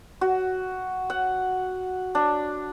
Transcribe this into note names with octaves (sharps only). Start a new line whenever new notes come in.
F#4
F#5
D4